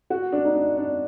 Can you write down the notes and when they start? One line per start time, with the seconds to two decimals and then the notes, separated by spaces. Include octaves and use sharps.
0.10 F#4
0.32 D4
0.45 D#4
0.54 D4
0.77 D4